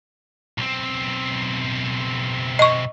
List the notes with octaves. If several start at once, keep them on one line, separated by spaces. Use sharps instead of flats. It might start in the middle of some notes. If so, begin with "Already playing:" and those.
B1 C4
D#5 C#6